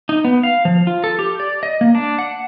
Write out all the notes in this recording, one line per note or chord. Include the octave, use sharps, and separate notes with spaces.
D#4
B3
F5
F3
F4
A4
G4
D5
D#5
A#3
D4
F#5